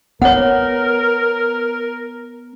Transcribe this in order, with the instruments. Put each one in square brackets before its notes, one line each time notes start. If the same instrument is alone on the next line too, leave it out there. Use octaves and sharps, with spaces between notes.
[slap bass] B3 [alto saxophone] A#4 [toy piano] C#5 F#5